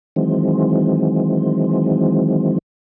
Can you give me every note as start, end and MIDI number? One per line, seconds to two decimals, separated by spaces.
0.16 2.58 51
0.16 2.58 52
0.16 2.58 54
0.16 2.58 56
0.16 2.58 60